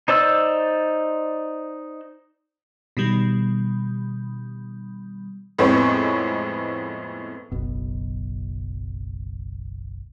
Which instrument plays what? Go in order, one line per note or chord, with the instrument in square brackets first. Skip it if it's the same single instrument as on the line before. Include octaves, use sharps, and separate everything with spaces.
[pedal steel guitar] D#4 C5 D5 E6
[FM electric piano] B2 D#3 G3
[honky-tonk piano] F2 A2 G#3 B3 C4 C#5
[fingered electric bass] F#1 B1 B2